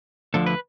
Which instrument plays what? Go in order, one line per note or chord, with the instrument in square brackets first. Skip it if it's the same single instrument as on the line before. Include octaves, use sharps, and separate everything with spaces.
[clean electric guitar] D2 D3 F3 A4
B4